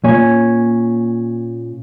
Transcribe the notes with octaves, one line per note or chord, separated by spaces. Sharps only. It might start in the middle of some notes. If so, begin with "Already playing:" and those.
A#2 C#4 G#6